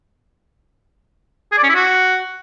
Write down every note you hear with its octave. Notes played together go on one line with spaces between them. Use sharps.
G#4
D5
C#4
E4
F#4